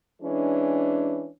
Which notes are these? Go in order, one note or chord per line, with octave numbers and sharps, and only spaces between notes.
E3 G#3 C#4 D4